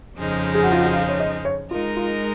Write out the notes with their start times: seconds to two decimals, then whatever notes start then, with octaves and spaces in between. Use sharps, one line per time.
0.16 F2 C#3 F3 G#3 D#4
0.55 G#4
0.63 F#4
0.72 F4
0.80 F#4
0.94 F5
1.09 C#5
1.20 D#5
1.45 C#5
1.71 G#3 D#4 F4 A#4
1.97 F4